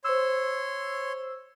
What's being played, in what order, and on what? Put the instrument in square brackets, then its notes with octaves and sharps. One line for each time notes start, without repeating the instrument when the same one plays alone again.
[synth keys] C5 E6 [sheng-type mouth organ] C#5 C6